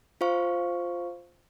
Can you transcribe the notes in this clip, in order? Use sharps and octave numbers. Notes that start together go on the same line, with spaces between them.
F4 C5 F5 C#6